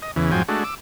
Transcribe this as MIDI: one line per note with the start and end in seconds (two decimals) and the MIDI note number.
0.02 0.11 75
0.16 0.31 40
0.16 0.31 49
0.16 0.31 52
0.32 0.43 41
0.32 0.43 44
0.32 0.43 53
0.32 0.43 54
0.32 0.43 79
0.32 0.43 80
0.49 0.64 56
0.49 0.64 57
0.49 0.64 62
0.49 0.64 66
0.64 0.75 86
0.64 0.75 88